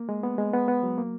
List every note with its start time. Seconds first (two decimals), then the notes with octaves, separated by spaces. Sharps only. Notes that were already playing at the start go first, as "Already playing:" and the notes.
Already playing: A#3
0.09 G#3
0.23 B3
0.38 G#3
0.53 B3
0.68 B3
0.83 F#3
0.98 A#3